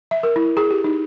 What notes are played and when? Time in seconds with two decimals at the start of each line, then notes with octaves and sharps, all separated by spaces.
0.11 E5
0.23 A#4
0.36 E4
0.57 G#4
0.71 G4
0.84 D#4